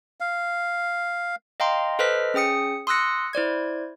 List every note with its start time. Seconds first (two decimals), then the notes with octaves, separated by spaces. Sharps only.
0.20 F5
1.60 D#5 F5 G5 A#5 C6
1.99 A4 B4 C5 D#5 F6 B6
2.34 C#4 G#4 G5 D#6 C#7
2.87 C6 D#6 E6 F#6 A#6 C#7
3.33 E4 C5 D5 G#6